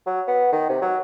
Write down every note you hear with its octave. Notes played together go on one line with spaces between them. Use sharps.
F#3
B3
D#3
C3
F#3